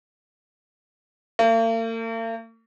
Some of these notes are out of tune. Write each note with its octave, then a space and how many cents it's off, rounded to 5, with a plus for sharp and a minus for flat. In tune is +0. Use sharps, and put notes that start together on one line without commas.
A#3 -45